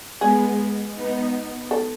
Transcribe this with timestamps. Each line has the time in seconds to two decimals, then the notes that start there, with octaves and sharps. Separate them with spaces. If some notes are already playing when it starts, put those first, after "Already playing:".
0.21 G#3 B3 G#4
0.95 B3 D#4
1.71 A4